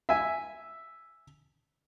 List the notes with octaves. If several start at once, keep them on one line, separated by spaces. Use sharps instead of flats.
E5 G#5